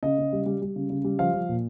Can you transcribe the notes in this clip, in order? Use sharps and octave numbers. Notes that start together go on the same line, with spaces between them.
C#3 D#5
C#3
G3
G3
G3
C#3
C#3
G3
F3 F5
F3
A#2